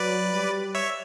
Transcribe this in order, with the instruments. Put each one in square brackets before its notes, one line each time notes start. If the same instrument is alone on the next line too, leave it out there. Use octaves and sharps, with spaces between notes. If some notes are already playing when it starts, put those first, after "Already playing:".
Already playing: [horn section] F#3 [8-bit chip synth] B4 D5
[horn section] G3
[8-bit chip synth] C#5 E5